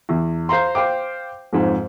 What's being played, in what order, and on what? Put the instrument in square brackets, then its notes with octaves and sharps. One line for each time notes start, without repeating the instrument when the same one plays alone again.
[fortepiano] E2
C5 F5 A#5 C6
C5 F5 G5 D6
F2 G#2